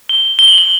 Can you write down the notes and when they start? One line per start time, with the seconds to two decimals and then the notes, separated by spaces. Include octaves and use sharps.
0.09 G7
0.39 G7
0.48 F#7
0.58 G7